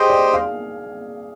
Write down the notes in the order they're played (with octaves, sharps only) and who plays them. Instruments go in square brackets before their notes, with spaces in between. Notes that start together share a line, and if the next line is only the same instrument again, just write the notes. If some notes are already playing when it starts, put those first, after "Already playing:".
Already playing: [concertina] G4 C5 D#5 G5 [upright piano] G#4
[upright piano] D5
F5